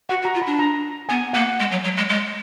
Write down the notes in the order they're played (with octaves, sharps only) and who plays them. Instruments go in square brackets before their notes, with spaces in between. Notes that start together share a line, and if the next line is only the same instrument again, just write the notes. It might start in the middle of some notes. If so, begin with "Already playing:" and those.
[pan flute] F#4 [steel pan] F#5
[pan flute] F#4
[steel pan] A#5
[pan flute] F4
[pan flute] D4 [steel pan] B5
[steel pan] A#5
[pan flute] B3 [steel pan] G#5
[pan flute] A#3 [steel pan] F#5
[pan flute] G#3
F#3
F#3
G#3
G#3